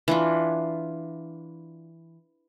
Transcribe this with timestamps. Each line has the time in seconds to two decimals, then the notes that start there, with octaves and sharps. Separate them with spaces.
0.08 E3 D4 F4